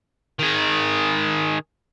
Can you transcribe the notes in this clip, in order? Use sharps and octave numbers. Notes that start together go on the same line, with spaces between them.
D#3 G#4